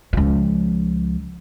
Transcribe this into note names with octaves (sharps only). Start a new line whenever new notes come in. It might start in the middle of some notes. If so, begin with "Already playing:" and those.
C#2 F3